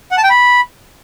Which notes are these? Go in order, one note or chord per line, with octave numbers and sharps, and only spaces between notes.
F#5
A5
G5
B5